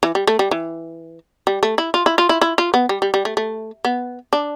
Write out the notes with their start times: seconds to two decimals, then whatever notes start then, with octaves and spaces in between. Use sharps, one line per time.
0.03 E3
0.15 G3
0.27 A3
0.39 G3
0.51 E3
1.47 G3
1.63 A3
1.78 E4
1.94 F4
2.06 E4
2.18 F4
2.29 E4
2.41 E4
2.58 F4
2.74 B3
2.89 G3
3.02 G3
3.14 G3
3.25 A3
3.37 A3
3.85 B3
4.33 D4